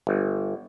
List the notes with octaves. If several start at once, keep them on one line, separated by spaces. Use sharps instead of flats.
G1